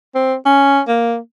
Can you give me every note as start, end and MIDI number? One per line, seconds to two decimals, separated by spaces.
0.15 0.36 60
0.46 0.81 61
0.88 1.18 58